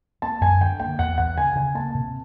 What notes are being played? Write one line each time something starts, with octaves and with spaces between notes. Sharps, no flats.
A#3 A5
F#2 G#5
D3 G5
A#3 G5
E2 F#5
E2 F#5
C#3 G#5
C#3 G#5
A#3 A5
C3